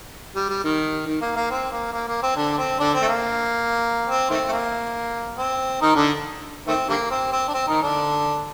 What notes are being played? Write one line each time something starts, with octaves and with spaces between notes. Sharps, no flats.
G3
G3
D#3
D#3
A#3
A#3
C4
A#3
A#3
A#3
C4
D3 D4
C4
D3 D4
C4
A3
A#3
C4
D#3 A3 C4
A3
A#3
C4
D#3 D#4
D3 D4
D#3 A3 C4
D3 G3 A#3
C4
C4
D4
C4
D#3 D#4
D3 D4